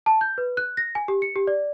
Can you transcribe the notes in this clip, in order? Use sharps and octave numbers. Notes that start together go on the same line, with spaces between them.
A5
G6
B4
F#6
A#6
G#5
G4
C#7
G4
D5